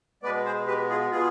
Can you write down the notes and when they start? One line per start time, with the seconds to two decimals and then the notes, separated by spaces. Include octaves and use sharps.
0.23 B2 G#3 B3 B4 D5
0.45 G#4 C5
0.67 G4 B4
0.89 F4 G#4
1.10 B2 B3 F4 G#4